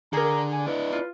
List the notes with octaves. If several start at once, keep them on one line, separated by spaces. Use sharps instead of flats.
D3 G#4 A#4 A#5
G#5
D4 E4 B4
F4